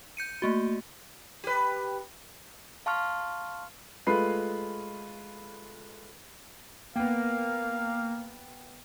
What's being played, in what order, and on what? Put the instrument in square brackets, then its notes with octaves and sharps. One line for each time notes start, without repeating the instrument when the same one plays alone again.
[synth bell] G6 C#7 D#7
A3 A#3 F#4
[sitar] G4 B4
[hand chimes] F5 A5 C6 C#6 F6
[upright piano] G#3 A3 F4 B4 B5 C7
[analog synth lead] A#3 [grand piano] B3 G5 [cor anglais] F5